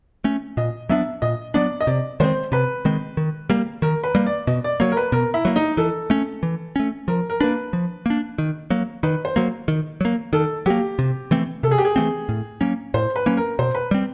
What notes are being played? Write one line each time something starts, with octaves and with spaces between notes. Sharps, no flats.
A3 C#4
A#2 D#5
F#3 B3 D4 E5
A#2 D#5
F#3 B3 D4 D5
D#5
C3 D5
D#3 G#3 C4 C5
C3 B4
D#3 G#3 C4
D#3
G3 A#3
D#3 A#4
B4
G3 A#3
D5
B2 D#5
D5
F#3 A#3 C#5
A#4
B4
B2 A#4
E4
F#3 A#3
D#4
E3 A4
A3 C#4
E3
A3 C#4
F3 A#4
A#4
A#3 D4 B4
F3
A#3 D4
D#3
F#3 A#3
D#3 B4
C5
F#3 A#3
D#3
F#3 A#3
D#3 A4
F#3 A#3 G4
C3
E3 A3 C4
C3 A4
G#4
G4
G#4
E3 A3 C4
A2
F#3 A#3 C#4
A2 C5
B4
F#3 A#3 C#4
A#4
B2 C5
B4
G3 C4